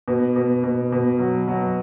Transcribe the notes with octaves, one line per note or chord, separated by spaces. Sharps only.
B2
B2
B2
B2
F#3
F#3